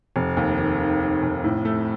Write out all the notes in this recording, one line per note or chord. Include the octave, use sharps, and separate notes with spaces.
F1
D#2
D#3
D#3
D#3
F1
A2
A3